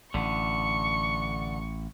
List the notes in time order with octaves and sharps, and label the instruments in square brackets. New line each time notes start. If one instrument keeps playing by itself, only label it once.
[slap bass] A1 [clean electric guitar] D3 [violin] C#6